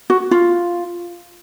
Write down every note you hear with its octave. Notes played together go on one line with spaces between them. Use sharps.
F#4
F4